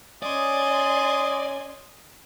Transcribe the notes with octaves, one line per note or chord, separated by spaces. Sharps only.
C#4 D5 D#5 G#5 C6